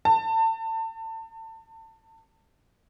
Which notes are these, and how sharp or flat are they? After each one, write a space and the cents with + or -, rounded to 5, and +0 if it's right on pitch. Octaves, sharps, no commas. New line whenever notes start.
A5 +30